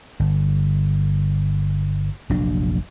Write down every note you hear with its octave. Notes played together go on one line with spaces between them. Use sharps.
G1
F1 A#1 F#3 D4